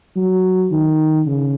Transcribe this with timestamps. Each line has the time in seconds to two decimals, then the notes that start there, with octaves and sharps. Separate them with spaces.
0.16 F#3
0.71 D#3
1.27 C#3